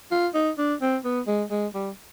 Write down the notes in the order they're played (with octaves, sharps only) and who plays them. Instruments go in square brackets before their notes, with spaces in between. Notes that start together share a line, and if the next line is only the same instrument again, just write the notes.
[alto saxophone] F4
D#4
D4
C4
B3
G#3
G#3
G3